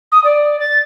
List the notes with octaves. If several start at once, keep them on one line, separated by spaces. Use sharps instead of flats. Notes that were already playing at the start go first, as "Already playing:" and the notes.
D#6
D5
A6